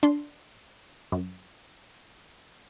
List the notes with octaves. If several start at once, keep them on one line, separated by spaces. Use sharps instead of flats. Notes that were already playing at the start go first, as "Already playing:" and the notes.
D4 C6
F#2